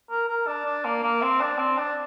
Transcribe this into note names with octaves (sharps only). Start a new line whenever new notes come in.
A#4
A#4
D4
D4
A#3
A#3
C4
D4
C4
D4